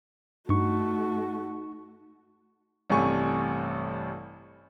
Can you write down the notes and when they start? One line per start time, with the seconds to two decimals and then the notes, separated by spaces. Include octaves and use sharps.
0.49 G2 A3 D#4 F#4 C#6
2.90 A1 G2 C3 A3 G#5 C#6